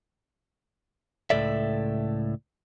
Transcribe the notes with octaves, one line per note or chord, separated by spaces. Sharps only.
C#2 A2 E3 A4 D5 E5